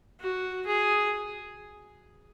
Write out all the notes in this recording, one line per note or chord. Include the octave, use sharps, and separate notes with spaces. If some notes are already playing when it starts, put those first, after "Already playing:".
F#4
G#4